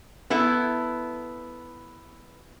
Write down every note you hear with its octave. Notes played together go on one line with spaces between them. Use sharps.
B3 E4 A4